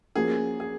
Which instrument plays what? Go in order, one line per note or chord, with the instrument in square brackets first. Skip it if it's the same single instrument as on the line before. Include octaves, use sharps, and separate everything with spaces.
[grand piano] F3 A#3 C#4 F#4 A#4 [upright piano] G#4
[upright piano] G#4